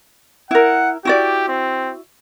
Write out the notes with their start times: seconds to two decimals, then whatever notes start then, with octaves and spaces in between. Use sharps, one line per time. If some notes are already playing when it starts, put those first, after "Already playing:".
0.51 E4 A#4 F#5
1.05 E4 F#4 G4 D5
1.48 C4